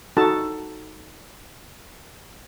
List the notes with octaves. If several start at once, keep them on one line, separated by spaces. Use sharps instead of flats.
D#4 F#4 A4 A5